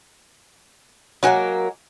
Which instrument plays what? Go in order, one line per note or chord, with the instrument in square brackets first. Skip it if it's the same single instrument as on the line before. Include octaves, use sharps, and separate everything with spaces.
[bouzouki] F#3 A#3 [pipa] G#3 F#4 G#5